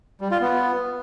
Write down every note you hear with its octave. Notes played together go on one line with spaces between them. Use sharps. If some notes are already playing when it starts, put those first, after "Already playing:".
G3
F4
B3